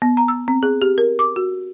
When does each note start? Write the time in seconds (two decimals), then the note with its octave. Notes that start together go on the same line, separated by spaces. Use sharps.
0.02 B3
0.17 A#5
0.28 E6
0.48 C4
0.63 G#4
0.82 G4
0.98 A#4
1.19 D6
1.36 F#4